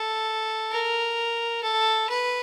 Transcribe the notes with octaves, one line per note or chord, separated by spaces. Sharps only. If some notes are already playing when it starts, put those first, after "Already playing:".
Already playing: A4
A#4
A4
B4